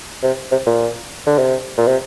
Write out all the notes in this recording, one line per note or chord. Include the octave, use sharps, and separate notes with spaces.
C3
C3
A#2
D3
C3
A#2
C3